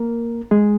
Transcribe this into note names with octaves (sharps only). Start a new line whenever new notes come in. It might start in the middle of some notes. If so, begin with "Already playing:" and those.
Already playing: A#3 A#4
G#3 G#4